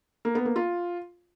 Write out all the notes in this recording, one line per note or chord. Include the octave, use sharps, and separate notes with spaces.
A#3
B3
A#3
F4